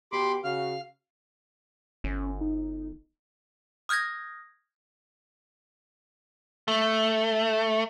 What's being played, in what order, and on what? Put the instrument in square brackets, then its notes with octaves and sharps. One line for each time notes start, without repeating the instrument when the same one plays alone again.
[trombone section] B2 G4 [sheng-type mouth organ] B5 C6 D6
[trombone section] C#3 F#4 [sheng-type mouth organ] F5 F6
[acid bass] G1 [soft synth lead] C#4
[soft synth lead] D#4
[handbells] D#6 F6 G6 G#6 A#6
[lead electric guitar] A3